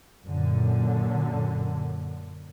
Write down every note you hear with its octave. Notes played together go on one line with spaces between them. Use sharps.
F#2 A#2 D3